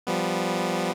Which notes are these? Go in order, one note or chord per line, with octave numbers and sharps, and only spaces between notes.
F3 G3 B3